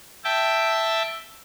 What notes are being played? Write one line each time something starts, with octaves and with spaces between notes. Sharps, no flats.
E5 G5 A5